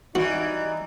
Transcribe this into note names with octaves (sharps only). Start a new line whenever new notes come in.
E3 G3 D#4 F#4